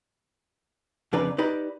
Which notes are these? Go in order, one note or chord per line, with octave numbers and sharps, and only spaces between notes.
F2 C#3 D4 B4 D5 A#5
D#4 G4 B4 D5